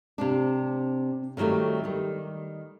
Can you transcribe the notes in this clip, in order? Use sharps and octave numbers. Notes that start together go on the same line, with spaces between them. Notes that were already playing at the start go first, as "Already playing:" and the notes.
C3 C4 D4
D3 D#3 F#3 G3 A3
D#3 G3